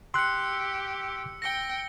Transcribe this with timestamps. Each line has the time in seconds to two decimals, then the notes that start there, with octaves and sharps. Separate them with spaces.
0.14 G4 C6 E6 F#6 C#7
1.42 G5 A#6 C#7 G7